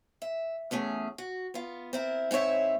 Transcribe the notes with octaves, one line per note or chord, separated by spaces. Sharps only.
E5
E2 A3 C#4 G#4
F#4
B3 F4
C4 E4 A#4
G#2 C4 E4 C#5 E5